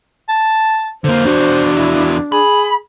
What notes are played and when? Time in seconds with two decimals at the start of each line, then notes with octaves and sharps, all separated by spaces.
0.29 A5
1.04 D3 A#3 C5
1.24 E2 D4 F#4
1.75 E4
2.32 G#4 B5